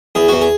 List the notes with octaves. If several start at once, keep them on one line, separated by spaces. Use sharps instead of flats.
E2 G#4
E2 F#4
G#4